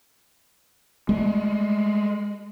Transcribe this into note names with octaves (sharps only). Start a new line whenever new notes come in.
G#3 A3